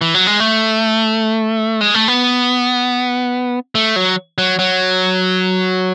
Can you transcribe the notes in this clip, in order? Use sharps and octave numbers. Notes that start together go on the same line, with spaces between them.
E3
F#3
G#3
A3
G#3
A3
B3
A3
F#3
F#3
F#3